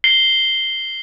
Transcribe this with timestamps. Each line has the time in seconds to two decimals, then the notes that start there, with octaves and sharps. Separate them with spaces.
0.04 C7 G7